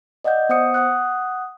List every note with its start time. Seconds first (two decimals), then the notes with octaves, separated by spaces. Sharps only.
0.24 D5 D#5 F5 F#5 G6
0.49 B3 C5 F#5 D#6 C#7
0.74 F#5 D#6 F#6